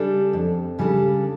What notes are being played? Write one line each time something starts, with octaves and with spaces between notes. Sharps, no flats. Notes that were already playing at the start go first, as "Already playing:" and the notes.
Already playing: C#3 G3 D4 A4
F2
C#3 G3 D4 A4